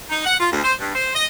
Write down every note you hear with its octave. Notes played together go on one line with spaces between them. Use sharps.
D#4
F#5
F4
D2
C5
G2
C5
D#5